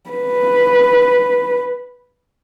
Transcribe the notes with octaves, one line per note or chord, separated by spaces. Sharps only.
B4